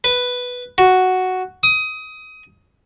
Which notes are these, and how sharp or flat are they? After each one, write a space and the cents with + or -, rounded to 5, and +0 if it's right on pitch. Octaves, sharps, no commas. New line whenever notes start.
B4 +0
F#4 +0
D#6 +20